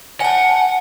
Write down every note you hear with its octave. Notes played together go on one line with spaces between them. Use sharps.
F#5 G#5 A5